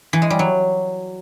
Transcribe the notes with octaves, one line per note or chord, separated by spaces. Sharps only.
E3
G#3
G3
F#3